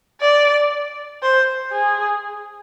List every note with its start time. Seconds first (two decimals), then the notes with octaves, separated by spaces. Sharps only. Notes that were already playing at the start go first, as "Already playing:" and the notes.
0.21 D5
1.23 C5
1.73 G#4